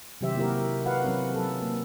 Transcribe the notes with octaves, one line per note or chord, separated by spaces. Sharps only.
C3 D#3 F#3 G4 C5 E5
A#3 E4 F#4 G4 A#4
F#4 A#4 B4 F5 F#5
F#3 C4 C#4
F#3 A4
A#3